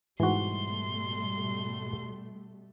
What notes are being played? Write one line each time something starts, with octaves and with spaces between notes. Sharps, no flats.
G#2 B2 E3 G3 A3 F#4 C6